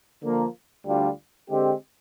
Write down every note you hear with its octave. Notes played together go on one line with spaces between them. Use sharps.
D3 F3 A#3
D2 D3 G3 D4 F4
D3 G#3 C4 G4